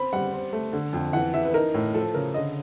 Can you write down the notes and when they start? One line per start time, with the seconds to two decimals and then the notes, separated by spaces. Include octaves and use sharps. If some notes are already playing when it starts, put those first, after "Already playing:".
Already playing: C4 B5
0.13 G3 F#5
0.33 C4
0.53 A3
0.73 D3
0.93 F2
1.13 E3 F#5
1.34 E3 E5
1.45 B4
1.54 D#4 A#4
1.74 A2
1.94 F3 A4
2.14 C#3 A#4
2.34 D3 D#5